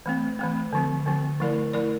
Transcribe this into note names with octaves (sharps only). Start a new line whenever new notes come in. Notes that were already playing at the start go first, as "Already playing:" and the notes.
E3 A3 C4
E3 A3 C4
D3 F3 C4
D3 F3 C4
F3 A3 E4 A#4 D5
F3 A3 E4 A#4 D5